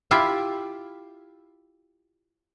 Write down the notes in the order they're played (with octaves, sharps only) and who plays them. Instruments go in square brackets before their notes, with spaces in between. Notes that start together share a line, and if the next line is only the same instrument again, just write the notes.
[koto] E4 F4 G4 E5